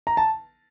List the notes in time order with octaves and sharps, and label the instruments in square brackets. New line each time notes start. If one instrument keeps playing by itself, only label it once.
[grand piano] A#5
A5